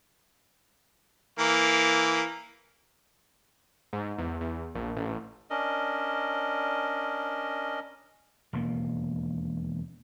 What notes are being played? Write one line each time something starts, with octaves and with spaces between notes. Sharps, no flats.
E3 A#3
G#2
E2
E2
A#1
A1
C#4 D4 A#4 D#5
E1 D#2 B2 A#3